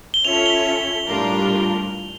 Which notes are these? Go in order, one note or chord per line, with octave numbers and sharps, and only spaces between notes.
G7
C#4 F4 A4 C#5 E5 F7
G7
A2 G3 D4 F4 A#4